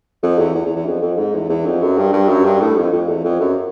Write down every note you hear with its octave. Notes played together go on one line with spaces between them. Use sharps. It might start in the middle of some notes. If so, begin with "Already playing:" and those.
F2
E2
E2
E2
E2
F2
F2
G#2
E2
E2
F2
F#2
G2
G2
F#2
G2
A2
F2
F2
E2
F2
F#2